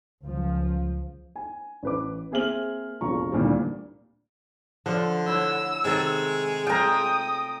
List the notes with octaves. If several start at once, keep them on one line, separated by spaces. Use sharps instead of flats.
C#2 F3
G#5
A1 B4 D6
A#3 C4 G#4 E5 F6 F#7
F1 A#1 B2 F4 A#5 C#6
G#1 D2 A#2 D#3 E3 G3
D3 F3 A3 D4
E4 C#5 F#5 E6
C3 D#3 G#3 A4
A3 F4 G5 A#5 D#6